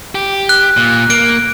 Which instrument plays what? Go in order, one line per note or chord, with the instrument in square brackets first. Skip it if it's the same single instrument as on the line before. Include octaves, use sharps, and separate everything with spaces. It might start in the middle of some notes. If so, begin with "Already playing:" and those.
[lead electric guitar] G4
[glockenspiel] F#6
[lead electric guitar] A#2
[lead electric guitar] A#3 [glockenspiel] D7